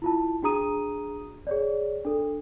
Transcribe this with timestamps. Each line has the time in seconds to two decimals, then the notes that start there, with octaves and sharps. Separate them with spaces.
0.02 E4 F4 A5
0.43 D4 F#4 G#4 A#5 D#6 D#7
1.47 G#4 C#5 D5
2.05 D4 A4